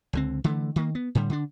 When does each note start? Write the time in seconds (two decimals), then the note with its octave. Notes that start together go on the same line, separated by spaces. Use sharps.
0.13 C#2 D3 C4
0.44 D3 E3 A3
0.76 D#3 A#3
0.95 B3
1.15 A2 D3 G3
1.30 D3 D4